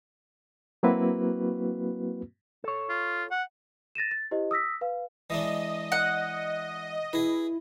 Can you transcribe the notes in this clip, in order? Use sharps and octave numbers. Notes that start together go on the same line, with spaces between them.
F#3 A#3 C4 E4 F#4 B4
A4 C#5
F4
F#5
A6 A#6 D#7 E7
A6
E4 G4 C5 D#5
D#6 E6 A#6 B6
B4 F5
E3 G#3 D4 D#5
F#5
E4 G#4 B4